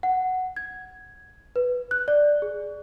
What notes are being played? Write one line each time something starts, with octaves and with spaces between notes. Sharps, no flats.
F#5
G#6
B4
F#6
D5
G#4